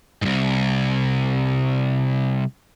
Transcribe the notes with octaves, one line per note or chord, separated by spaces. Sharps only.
C2 G#2